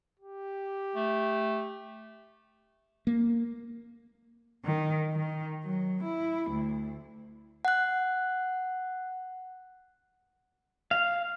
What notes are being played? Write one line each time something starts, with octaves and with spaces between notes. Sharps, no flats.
G4
A3
A#3
D#3
D#3
F#3
E4
D2
F#5 F#6
F5